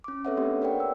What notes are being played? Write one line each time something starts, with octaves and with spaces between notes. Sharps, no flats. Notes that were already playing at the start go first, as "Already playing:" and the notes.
C#4 D6
C4 A4 B4 C#5 E5 F#5
A#3 B3 D4 G4
A#4 B4 C#5 D5 F#5 G5
E6